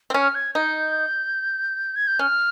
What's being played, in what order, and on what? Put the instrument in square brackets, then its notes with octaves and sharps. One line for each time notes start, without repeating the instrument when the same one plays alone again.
[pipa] C4
[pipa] C#4 [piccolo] F6
[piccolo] G#6
[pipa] D#4 [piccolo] G6
[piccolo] G#6
G6
[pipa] C#4 [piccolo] F6